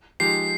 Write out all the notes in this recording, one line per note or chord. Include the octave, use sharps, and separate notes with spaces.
F3 G#3 D#4 G4 C7